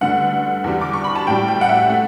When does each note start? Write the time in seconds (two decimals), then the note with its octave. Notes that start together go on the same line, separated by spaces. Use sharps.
0.01 G2 D3 A3 F#5
0.64 E2 D3 G3
0.81 D6
0.93 C#6
1.04 B5
1.15 A5
1.27 A2 G3 G5
1.48 G5
1.61 F#5
1.69 E5
1.90 A3